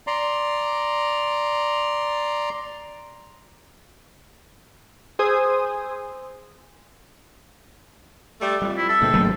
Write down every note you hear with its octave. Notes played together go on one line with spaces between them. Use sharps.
D5 A#5 C6
G#4 C5 G#5 C6 D#6 E6
G3 A3
F2 G3
E4
A4 E5
D2 A#2 G#3 A3 C4
G#1 G2 F#3 A3 A#3